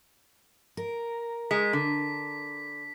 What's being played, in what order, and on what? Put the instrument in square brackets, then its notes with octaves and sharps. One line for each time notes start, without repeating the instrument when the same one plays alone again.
[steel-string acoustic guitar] A#4
[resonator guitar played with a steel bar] G#3 [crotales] B6
[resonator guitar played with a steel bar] D3